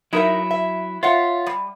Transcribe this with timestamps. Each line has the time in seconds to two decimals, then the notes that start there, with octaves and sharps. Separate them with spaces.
0.13 F#3 D#4 E4 A#4 E5
0.51 E5
1.03 F4 C#5 E5 F#5
1.46 G3